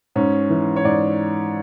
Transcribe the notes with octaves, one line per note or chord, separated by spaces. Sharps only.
G#2 C#4
E3
C#5
G#2 D5